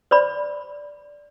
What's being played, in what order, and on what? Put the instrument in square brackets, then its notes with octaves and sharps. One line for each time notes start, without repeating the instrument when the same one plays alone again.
[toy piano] C5 D5 B5